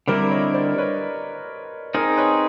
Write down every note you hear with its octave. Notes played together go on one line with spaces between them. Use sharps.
D3 G3 C4 E4 A#4 C5
C#5 D#5
C5 D5
B4 C#5
C4 D#4 G#4 A#4 C5
B4 C#5